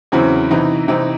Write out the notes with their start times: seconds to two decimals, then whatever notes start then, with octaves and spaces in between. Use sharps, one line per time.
0.12 E2 C#3 F#3 C4 E4
0.50 C3 E3 C4 D#4
0.88 C3 E3 C4 D#4